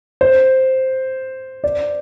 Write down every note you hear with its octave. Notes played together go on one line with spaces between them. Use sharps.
C5
D5